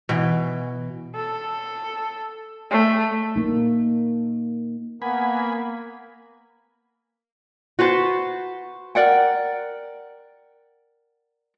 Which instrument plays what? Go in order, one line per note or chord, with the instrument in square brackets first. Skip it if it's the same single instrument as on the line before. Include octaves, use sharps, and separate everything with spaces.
[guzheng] B2 E3
[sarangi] A4
A3
[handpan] A#3 D#4
[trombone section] A#3 [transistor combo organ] B3 G#5 B5 [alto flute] F#5
[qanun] F#4 B4 C5 A5
[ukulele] A#4 D5 F#5 G5